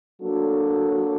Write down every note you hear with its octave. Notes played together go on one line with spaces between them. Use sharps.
F#3 A#3 D4 F#4 A4